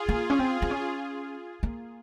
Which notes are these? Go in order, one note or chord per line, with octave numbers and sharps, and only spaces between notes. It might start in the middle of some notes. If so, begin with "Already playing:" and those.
Already playing: F4 G#4
A#3
C#4
C4
C4
C#4
A#3